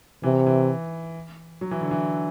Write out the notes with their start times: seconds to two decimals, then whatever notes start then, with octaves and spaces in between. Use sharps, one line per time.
0.23 C3 E3
0.47 E3
1.61 F#3
1.71 E3
1.81 D3
1.91 E3